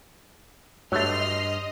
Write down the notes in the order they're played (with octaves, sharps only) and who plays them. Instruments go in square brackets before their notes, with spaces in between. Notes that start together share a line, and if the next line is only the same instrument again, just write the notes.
[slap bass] G2 [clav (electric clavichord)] F#3 A3 [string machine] D#5 [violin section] C6 F6 C7